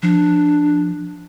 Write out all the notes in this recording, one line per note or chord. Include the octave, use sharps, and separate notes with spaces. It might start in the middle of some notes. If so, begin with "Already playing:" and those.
F3 D4